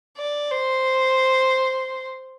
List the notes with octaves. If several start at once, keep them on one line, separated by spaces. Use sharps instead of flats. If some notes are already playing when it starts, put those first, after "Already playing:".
D5
C5